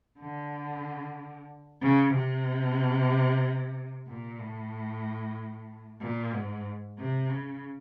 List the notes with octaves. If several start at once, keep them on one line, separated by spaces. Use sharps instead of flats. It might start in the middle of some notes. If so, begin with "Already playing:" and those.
D3
C#3
C3
A#2
A2
A#2
G#2
C3
C#3